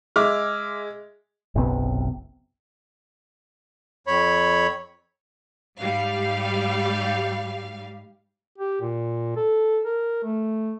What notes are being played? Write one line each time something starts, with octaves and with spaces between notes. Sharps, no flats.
G#3 E5 D6 F6
F#1 B1 C3 B3
F2 C#5 B5
G#2 G3 F5
G4
A#2
A4
A#4
A3